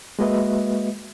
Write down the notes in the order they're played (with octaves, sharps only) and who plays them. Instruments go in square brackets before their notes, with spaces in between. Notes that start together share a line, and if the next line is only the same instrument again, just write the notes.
[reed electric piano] G#3 A#3 F#4 B4 D#5 E5